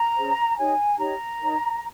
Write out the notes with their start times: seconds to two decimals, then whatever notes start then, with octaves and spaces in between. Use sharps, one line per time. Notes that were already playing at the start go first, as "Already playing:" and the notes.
Already playing: A#5
0.16 C#4 G#4 C5
0.58 D#4 G4 C#5 G#5
0.99 D#4 G4 C#5 A#5
1.40 D#4 A#4 C#5